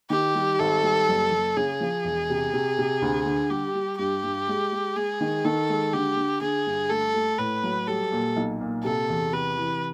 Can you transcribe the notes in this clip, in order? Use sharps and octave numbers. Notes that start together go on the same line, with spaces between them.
D#3 G4
G3
G#1 A4
G3
F#1
F#1
C#3 G#4
F3
E1
C3
C3
C3
D2
D3
G3 G4
G3
G2 G4
G2
G#3
G#3
G#3 G#4
D#3
D#3 A4
G#3
D3 G4
D3
D3 G#4
G2
A3 A4
A3
A2 B4
F#3
G3 A4
A#2
B1
A#2
C3 A4
E2
C3 B4
E3